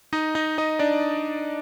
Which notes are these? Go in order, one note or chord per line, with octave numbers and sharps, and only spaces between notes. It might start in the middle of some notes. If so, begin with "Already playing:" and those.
D#4 D#5
D#4 D#5
D#4 D#5
D4 D5